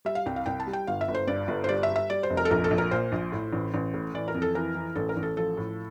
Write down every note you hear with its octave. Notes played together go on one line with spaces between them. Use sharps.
G3 E5
F5
C2 G5
F5
C2 G5
A5
G3
G5
G1 F5
E5
G1
C5
G2 D5
G1
C5
G3 D5
E5
G3
E5
G3 D5
C5
F1
A#4
A4
A#1 A#4
A4
A#1
A#4
A#2 C5
A#1
A2
A1
A1
A2
E3 D5
A#4
F2
A4
E3 A#4
E3
A1 A4
A#4
A1
A4
F3 A4
A2